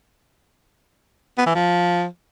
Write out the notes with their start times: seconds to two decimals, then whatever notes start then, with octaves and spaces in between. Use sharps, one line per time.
1.38 B3
1.46 E3
1.55 F3